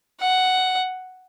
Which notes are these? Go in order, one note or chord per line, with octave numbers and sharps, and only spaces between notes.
F#5